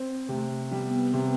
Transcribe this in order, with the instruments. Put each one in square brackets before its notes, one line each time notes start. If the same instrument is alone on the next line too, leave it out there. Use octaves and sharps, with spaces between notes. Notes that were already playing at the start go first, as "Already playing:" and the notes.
Already playing: [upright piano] C4
[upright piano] C3 [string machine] A3
[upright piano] G3 [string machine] B3
[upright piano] C3